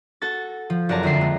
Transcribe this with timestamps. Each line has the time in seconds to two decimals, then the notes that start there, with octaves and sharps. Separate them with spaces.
0.22 F#4 A4 A6
0.70 F3
0.89 F#1 F#4 D5 A5 A#5
1.03 F2 D3 E5 C7
1.21 G#3